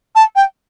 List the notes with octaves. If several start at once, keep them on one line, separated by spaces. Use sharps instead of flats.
A5
G5